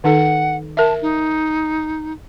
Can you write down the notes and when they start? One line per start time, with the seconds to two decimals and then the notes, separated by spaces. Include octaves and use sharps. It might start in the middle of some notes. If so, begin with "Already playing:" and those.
0.04 D#3 D#4 A4 F#5
0.77 A#4 E5 A5
1.02 D#4